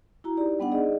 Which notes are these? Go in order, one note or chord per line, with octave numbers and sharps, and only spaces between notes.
E4 F#4 A#5
D#4 G4 D5
G3 B3 D4 F#5
D#4 G#4 D5 D#5